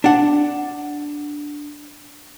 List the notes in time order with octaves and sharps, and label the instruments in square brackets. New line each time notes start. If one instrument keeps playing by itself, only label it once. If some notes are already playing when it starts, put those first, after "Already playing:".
[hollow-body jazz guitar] D4 F#5